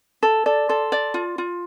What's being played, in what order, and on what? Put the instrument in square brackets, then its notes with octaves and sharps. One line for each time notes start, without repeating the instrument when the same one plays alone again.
[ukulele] A4
[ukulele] A4 [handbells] D5
[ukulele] A4 [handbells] C6
[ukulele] D5
F4
F4